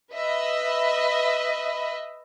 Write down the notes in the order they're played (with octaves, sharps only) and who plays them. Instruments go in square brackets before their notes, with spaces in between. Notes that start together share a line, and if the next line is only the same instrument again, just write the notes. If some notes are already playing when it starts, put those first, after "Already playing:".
[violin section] B4 D#5 E5